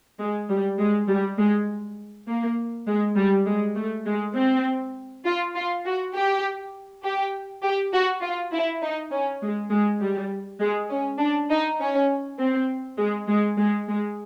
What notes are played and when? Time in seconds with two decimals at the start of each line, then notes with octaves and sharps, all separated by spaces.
0.19 G#3
0.49 G3
0.79 G#3
1.08 G3
1.38 G#3
2.27 A#3
2.87 G#3
3.16 G3
3.46 G#3
3.76 A3
4.06 G#3
4.35 C4
5.25 F4
5.55 F4
5.85 F#4
6.14 G4
7.04 G4
7.63 G4
7.93 F#4
8.22 F4
8.53 E4
8.82 D#4
9.12 C#4
9.42 G#3
9.71 G#3
10.01 G3
10.60 G#3
10.90 C#4
11.20 D4
11.50 D#4
11.80 C#4
12.39 C4
12.98 G#3
13.28 G#3
13.58 G#3
13.88 G#3